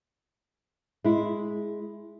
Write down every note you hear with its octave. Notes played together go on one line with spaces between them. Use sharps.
G#3 E4